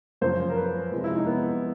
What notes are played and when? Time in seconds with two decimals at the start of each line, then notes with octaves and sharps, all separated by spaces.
0.21 F#2 C#3 F3 C5
0.49 A#4
0.57 B4
0.92 C3 F3 G#3
1.04 E4
1.16 D#4
1.27 B3